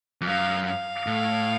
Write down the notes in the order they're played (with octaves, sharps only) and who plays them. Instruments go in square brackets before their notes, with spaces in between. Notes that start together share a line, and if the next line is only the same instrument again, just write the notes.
[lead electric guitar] F2
[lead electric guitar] F#2 [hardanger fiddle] F5
[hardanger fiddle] F5
[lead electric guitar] A2